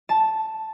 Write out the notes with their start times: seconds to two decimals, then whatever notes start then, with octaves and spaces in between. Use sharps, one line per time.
0.09 A5